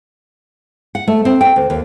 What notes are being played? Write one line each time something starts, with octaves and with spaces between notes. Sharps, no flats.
F#5
A3
C4
G5
D2
D#2